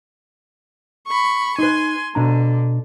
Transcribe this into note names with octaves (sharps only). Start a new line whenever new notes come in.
B5 C#6
D#4 B4 G#5 C6
B2 D3 D4 A#5